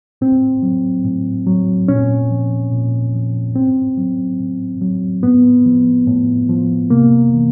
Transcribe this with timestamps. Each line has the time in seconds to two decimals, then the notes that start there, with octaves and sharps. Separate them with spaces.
0.21 A2 C4
0.63 F#3
1.05 A2
1.47 F#3
1.88 A#2 C#4
2.31 F3
2.72 A#2
3.15 F3
3.56 A2 C4
3.97 F#3
4.40 A2
4.81 F#3
5.23 A2 B3
5.66 F3
6.07 A2
6.49 F3
6.90 C3 A#3
7.33 E3